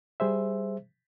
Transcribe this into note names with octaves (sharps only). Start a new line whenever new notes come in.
G3 G#4 C5 E5